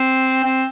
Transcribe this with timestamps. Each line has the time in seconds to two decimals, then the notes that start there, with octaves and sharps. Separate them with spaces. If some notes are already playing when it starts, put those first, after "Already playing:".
Already playing: C4
0.44 C4